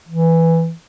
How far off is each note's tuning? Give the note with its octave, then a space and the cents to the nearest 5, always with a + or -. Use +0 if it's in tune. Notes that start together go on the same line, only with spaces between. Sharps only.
E3 +0